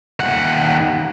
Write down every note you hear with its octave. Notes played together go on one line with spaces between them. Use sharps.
D#2 F#5